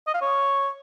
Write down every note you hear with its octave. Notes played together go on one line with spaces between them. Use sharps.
D#5
F5
C#5